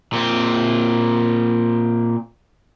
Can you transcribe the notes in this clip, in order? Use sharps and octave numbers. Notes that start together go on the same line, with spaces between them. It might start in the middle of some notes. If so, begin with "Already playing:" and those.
A#2 C4